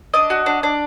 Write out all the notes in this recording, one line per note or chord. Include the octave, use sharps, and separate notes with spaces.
D4 D#5
F#4
D4
D4